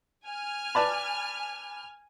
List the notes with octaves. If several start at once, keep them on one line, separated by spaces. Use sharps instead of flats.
G#5 F6
B4 D5 A5